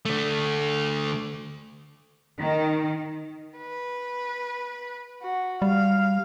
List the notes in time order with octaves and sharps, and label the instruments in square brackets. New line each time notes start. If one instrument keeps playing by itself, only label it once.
[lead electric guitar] D3 A3
[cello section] D#3
[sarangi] B4
F#4
[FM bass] G3 [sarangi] F5